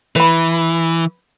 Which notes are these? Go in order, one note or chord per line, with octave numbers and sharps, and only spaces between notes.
E3 B4 B5